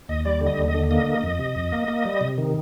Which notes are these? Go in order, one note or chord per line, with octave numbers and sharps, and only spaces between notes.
D#2 D#5
G3 D5
D3
D#5
D#2
D#5
D3
A#3 D#5
A#3
F2
C3
F2
A#3
A#3
G3
C3
D#3